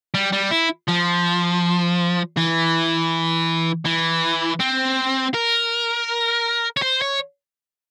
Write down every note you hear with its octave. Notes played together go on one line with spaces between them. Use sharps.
G3
G3
E4
F3
E3
E3
C4
A#4
C#5
C5
C#5